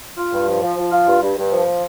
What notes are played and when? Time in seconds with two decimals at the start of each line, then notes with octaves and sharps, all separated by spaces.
0.17 F4
0.32 G2
0.48 F3
0.63 F3
0.77 F3
0.91 F4
1.07 G2
1.22 G2
1.37 G2
1.51 F3